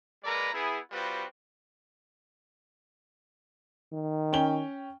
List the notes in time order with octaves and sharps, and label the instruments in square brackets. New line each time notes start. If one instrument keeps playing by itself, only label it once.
[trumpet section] G#3 A#3 A#4 B4 D5 A#5
B3 E4 G#4
G3 C4 F4 F#4 B4
[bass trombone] D#3
[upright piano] C#4 G5 G7